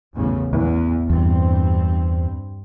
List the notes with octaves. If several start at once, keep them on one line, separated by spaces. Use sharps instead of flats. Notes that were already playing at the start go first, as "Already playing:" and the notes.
A1 E2 C#3
E2
E2 G2 C4